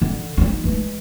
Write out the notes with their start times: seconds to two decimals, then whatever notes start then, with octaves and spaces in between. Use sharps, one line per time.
0.02 D3
0.37 D4 D#4
0.64 E3 G#3